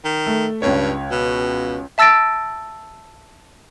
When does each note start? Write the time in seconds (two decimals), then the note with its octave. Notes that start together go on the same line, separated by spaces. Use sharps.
0.05 D#3
0.26 A3
0.62 C#2 G2 C#5
1.11 B2
1.98 E5 A5 E6 A6 A#6 D7